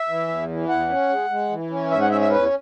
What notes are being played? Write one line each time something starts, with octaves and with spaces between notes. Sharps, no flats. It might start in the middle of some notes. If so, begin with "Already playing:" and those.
Already playing: E5
E3
E2
E3
E2 F#5
C#4
G#3
G#3
E3
C#4
G#2 E5
F#5
C#4 E5
E5
E2 B4